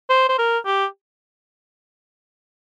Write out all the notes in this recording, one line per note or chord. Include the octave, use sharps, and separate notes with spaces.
C5
C5
A#4
G4